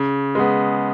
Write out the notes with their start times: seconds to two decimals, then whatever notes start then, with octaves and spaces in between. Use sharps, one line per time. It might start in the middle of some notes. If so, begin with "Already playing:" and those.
Already playing: C#3
0.35 G#3 B3